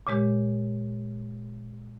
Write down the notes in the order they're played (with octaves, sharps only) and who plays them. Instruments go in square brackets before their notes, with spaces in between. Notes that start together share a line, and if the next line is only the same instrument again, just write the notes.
[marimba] A#2 C#3 G#3 G4